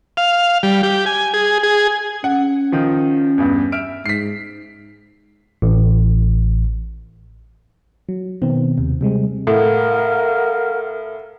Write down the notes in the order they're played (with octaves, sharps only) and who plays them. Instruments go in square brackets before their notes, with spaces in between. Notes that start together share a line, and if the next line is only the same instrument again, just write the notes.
[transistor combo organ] F5
G3
G4
G#5
G#4
G#4
[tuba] C#4 [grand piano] F#5
[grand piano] D#3 F3
E2 G2
E5 F6 D7
[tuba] G#2 [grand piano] B6 C7
[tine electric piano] A1
[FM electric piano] F#3
B2 D#3 B3 C4
D#2 C3
C3 G3 G#3 C4
[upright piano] A2 [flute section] A#4 F5 F#5